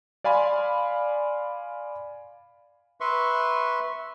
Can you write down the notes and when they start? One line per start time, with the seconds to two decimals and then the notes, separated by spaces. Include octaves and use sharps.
0.24 D5 F5 G#5 B5 C6
3.00 B4 E5 C6 C#6